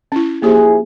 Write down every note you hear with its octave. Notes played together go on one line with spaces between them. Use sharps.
C#4 E4
F3 A#3 E4 G4 G#4 C5